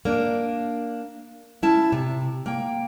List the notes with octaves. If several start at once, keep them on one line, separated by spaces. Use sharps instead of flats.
A#3 D4
C#4 E4 A5
C3
A#3 G5